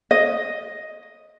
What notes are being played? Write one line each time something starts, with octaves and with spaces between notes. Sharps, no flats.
D#5